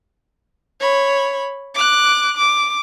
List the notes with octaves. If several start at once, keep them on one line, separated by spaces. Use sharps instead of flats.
C#5 B5
D6 F#6
D6